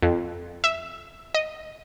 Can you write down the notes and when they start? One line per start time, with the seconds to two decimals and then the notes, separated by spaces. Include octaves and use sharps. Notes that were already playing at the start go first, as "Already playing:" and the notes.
0.03 F2
0.64 E5
1.34 D#5